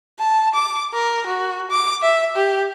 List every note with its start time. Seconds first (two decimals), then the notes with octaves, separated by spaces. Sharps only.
0.19 A5
0.54 D6
0.94 A#4
1.27 F#4
1.71 D6
2.02 E5
2.36 G4